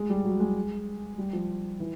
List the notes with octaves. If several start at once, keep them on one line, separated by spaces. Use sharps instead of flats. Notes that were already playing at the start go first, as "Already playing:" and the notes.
Already playing: G#3
G3
F#3
G#3
G3
F3
E3